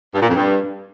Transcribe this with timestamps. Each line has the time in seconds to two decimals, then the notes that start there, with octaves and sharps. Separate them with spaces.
0.15 G2
0.22 A#2
0.29 F2
0.36 G2